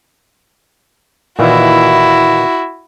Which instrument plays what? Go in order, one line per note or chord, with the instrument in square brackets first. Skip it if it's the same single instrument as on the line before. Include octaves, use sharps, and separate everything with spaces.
[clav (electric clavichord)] A#2 D#3 E3 [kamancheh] E4 F#4